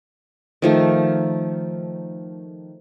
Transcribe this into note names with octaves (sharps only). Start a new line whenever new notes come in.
D#3 F3 A3